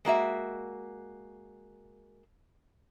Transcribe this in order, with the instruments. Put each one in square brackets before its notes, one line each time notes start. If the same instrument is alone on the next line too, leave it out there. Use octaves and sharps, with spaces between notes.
[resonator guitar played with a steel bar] G#3 A#3 F#4 E5